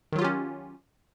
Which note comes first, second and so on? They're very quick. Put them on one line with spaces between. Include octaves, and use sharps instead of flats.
D#3 F#3 F4 G4 C#4